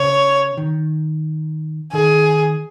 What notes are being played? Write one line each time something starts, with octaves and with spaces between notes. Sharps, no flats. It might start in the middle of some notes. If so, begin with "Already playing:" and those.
Already playing: C#3 C#5
D#3
D#3 G#4